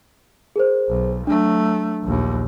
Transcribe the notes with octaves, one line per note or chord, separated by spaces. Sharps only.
G#4 A#4 C5
B1
F#3 A3 D4
A#1 D#2